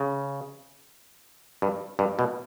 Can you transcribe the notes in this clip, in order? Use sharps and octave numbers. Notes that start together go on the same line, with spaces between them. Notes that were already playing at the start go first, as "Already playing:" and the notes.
Already playing: C#3
G2
G2
B2